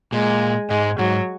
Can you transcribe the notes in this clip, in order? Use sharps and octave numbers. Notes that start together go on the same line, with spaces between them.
A#2 G#3
G#2 G#3
G#2 F#3